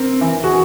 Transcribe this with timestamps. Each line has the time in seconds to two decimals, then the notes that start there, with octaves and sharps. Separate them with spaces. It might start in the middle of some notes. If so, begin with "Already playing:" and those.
Already playing: C4 A#4
0.21 E3
0.44 F#4 G#4